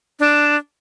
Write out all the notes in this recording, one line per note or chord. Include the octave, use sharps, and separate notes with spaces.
D4